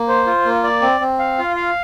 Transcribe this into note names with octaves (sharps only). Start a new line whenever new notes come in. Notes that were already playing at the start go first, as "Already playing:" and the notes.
Already playing: A#3
C5
F4
A#3
D5
C4
C4
F5
F4
F5